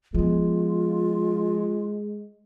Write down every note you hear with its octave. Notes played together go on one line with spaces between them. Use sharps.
F3 G#3 B3 F4